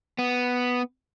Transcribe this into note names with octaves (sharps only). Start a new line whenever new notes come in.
B3